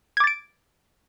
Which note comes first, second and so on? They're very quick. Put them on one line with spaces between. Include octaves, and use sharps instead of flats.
G#6 D6 A6 D7